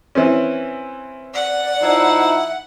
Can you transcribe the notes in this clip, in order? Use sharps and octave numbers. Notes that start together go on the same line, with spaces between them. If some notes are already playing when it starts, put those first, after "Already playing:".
E3 C4 C#4
D5 F#5
F3 D#4 E4
E5